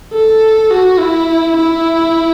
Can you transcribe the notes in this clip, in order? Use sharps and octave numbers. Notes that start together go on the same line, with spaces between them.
A4
F#4
E4
E4